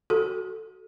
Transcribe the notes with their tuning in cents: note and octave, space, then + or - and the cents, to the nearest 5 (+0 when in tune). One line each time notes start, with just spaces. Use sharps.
F#4 +10 A4 +0